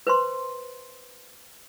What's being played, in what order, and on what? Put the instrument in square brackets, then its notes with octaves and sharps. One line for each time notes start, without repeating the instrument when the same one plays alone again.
[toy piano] B4 C5 C6